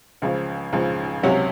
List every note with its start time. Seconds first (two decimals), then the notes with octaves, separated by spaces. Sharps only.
0.22 C#2 C#3 F3
0.73 C#2 C#3 F3
1.23 C#2 C3 F#3 C#4 F#4